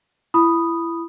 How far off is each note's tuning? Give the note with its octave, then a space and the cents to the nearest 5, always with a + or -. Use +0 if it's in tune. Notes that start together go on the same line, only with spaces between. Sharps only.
E4 +25 B5 +0 D#6 -5